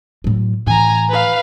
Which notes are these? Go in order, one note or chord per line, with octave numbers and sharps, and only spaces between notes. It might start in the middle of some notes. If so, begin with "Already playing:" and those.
A2 F#3
A2 E3 G#5 A#5
B4 F5